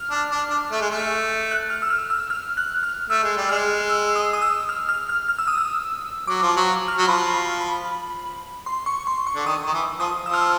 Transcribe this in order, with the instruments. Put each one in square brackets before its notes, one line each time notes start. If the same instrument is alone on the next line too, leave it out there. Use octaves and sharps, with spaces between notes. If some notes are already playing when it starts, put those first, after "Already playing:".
Already playing: [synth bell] F6
[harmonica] D4
D4
D4
A3
G#3
A3
[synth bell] F#6
F6
E6
F6
E6
F6
F#6
F6
[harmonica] A3 [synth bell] E6
[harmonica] G#3
G3
[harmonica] G#3 [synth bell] F6
[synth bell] E6
D#6
D#6
E6
F6
F6
F6
F6
E6
D#6
E6
[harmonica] F#3 [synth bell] D6
[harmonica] F3
[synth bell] D6
[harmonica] F#3
[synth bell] F6
[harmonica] F#3
[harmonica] F3 [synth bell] B5
[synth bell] B5
B5
C6
C#6
C6
C#6
[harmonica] D3
[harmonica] D#3 [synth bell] D#6
[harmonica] D#3
E3
[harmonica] F3 [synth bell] D#6
[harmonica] F3 [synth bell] E6
[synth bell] F6
E6